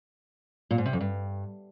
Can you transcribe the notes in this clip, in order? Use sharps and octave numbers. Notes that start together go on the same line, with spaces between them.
A#2
G#2
C3
F2
G2